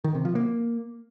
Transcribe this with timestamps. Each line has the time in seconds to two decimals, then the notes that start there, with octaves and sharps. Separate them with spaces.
0.04 D#3
0.15 C3
0.25 F3
0.35 A#3